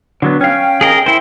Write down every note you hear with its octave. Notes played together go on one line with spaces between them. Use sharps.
D3 F#3 B3
C#4 F5 G5
G#4 A#4 D#5
E4 C5